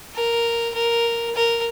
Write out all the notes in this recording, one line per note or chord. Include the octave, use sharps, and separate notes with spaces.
A#4
A#4
A#4